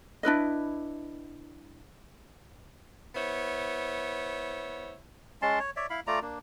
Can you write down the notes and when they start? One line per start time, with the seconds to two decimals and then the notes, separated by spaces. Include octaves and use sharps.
0.23 D4 E4 B4 D#5
3.15 B3 E4 C5 C#5
5.42 G#3 C#4 A5 C6
5.59 C#5
5.76 C#5 D5 E5
5.90 E4 F5 B5
6.07 A3 F4 D5 A#5
6.22 A#3 D4